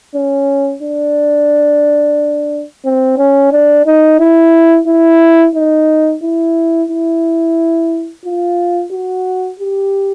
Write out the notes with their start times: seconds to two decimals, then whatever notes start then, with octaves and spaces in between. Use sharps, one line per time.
0.15 C#4
0.83 D4
2.85 C4
3.18 C#4
3.52 D4
3.86 D#4
4.20 E4
4.87 E4
5.55 D#4
6.23 E4
6.90 E4
8.25 F4
8.92 F#4
9.59 G4